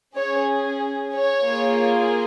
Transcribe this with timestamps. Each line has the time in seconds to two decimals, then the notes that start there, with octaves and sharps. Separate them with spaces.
0.15 C#4 G#4 C#5
1.13 C#5
1.46 A#3 F4 G#4